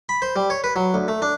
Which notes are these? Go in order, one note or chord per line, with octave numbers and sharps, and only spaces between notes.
B5
C5
G3
C#5
B4
F#3
D2
A3
D4